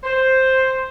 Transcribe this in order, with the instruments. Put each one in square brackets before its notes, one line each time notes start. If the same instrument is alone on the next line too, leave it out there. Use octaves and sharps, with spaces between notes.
[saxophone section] C5